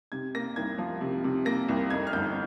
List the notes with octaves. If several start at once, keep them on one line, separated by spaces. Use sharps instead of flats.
C3 G#6
A#3 A#6
C2 G#6
F3
C3
C3
A#3 A#6
C2
F2 G#6
F6
G1 G6